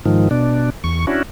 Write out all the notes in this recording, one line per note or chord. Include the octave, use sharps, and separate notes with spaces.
G#2 D#3 F3
B2 D4
E2 C#6
C#4 D4 E4 F#4